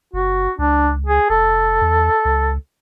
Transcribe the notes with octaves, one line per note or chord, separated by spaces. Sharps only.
F#1 F#4
C#2 D4
G#4
F1 A4
E2
C#2